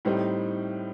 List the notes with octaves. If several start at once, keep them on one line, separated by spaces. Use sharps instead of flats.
A2 G3 C4 D#4